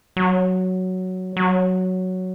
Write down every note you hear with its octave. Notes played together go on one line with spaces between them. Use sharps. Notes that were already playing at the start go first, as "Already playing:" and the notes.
F#3
F#3